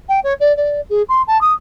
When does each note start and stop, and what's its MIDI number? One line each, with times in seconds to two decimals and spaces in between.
0.09 0.20 79
0.24 0.34 73
0.40 0.55 74
0.57 0.81 74
0.90 1.02 68
1.09 1.22 84
1.27 1.40 81
1.41 1.53 87